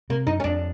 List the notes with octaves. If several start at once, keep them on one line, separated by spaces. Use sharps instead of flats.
C3 A#3
F#2 D#4
C#4
F2 D4